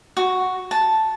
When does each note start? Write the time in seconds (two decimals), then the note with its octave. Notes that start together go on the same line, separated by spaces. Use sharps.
0.17 F#4
0.71 A5